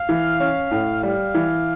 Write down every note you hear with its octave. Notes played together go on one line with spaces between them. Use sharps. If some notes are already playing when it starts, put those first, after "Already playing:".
Already playing: F5
E3
C#4
A2
G3 F5
E3